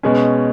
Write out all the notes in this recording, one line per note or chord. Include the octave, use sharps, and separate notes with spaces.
B2 G#3 C#4